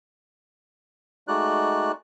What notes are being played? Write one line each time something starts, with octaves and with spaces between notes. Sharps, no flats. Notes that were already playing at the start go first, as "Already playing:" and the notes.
G#3 A3 D#4 F#4 D5 F#6